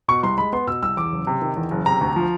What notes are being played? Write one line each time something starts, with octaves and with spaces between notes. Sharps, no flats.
B2 C#6
C2 C6
G#3 B5
B3 C6
B2 E6
C2 E6
E2 D6
F#1
C3
D#3
E2
F#1
C3 A#5
D2
F3